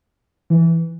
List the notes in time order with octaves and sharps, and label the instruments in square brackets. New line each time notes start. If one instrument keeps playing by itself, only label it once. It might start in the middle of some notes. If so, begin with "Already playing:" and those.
[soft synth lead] E3